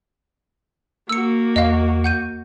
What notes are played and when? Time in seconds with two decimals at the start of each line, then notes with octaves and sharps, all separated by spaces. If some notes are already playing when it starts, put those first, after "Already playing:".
1.09 A#3 F#4 E6 C#7
1.56 E2 D#5 F5
2.04 F#5 G6 D#7